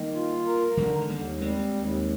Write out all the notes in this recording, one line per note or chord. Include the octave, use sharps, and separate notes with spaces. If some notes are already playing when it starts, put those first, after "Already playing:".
Already playing: D#3 G3 A#3
F4
A#4
D3 D#3 G3
G#3
D#2 G3 A#3
G3 G#3 C4
D#2